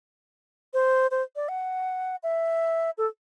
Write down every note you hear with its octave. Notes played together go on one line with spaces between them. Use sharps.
C5
C5
D5
F#5
E5
A4